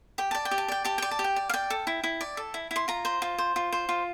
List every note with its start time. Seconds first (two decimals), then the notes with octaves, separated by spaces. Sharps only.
0.18 G4 G5
0.31 D5 A5
0.45 G5
0.51 G4
0.58 A5
0.68 D5 G5
0.85 G4 A5
0.98 D5 G5
1.11 A5
1.19 G4
1.24 G5
1.36 D5
1.49 F5
1.54 D5 G5
1.70 A4
1.87 E4
2.04 E4
2.21 D5
2.37 A4
2.54 E4
2.71 E4
2.76 C6
2.88 F4 A#5
3.05 C5
3.22 F4
3.38 C5
3.56 F4
3.73 C5
3.89 F4